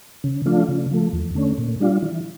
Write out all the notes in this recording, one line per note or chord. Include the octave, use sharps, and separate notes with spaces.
C#3
F3 A3 D4 F4
C#3
F3 A3
E2
D3 A3 C#4
A#2
G3 D4 F4
E3